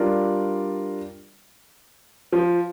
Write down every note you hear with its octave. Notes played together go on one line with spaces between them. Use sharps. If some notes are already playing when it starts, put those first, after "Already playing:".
Already playing: G3 D4 F4 A#4 D5
F3